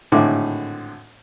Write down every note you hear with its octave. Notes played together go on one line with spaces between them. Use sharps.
G#1 A2 D3 D6